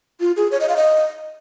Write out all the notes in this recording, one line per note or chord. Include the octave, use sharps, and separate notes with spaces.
F4
G#4
C#5
D#5
F5
D#5